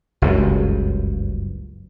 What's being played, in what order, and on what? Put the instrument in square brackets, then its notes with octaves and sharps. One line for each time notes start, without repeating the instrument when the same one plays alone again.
[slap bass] F#1 C#2 G2